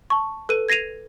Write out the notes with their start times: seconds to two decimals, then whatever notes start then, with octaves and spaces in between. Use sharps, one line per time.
0.10 A5 C#6
0.49 A4 B4 D#7
0.69 G#6 A#6 C7 D#7 F7